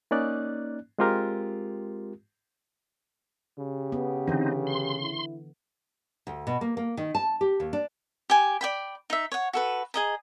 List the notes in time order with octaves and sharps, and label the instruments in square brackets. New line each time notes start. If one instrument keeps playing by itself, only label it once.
[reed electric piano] A#3 C#4 D#4 D5 F#6
G#3 C4 F4 G4 A#4
[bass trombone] C#3 [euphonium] G4
[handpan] B3
[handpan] D3 E3 [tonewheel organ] C4 D#4
[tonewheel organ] C6
[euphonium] E4
[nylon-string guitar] D2
B2
A#3
A#3
D#3
A5
G4
D#2
D4
[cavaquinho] G4 G#5
D5 G5 B5
D#4 E5
C#5 F#5
F#4 A4 B4
G#4 D#5 A#5